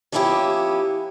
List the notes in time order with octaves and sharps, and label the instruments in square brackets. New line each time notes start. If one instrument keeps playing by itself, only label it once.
[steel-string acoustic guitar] F3 A#3 B3 C#4 E4 G4